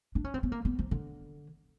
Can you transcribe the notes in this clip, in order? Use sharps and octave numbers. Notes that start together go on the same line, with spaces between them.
D4
C#4
C4
B3
A#3
B3
F3
D3